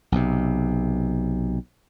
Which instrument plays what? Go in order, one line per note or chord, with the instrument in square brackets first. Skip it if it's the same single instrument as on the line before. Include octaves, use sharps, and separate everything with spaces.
[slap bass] B1 C3